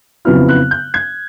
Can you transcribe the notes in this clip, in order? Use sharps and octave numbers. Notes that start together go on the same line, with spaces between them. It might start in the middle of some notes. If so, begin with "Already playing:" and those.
F2 C#3 F#3 B3 E4 F6
F#6
G6
G#6